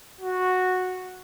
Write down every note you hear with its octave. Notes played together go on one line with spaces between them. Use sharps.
F#4